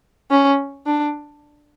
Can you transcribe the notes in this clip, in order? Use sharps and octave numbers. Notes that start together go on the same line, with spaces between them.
C#4
D4